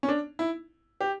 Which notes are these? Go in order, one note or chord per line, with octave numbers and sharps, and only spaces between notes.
C#4
D4
E4
G4